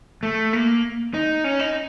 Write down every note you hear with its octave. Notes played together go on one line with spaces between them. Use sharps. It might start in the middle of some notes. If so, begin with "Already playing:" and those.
A3
A#3
D#4
C#4
D#4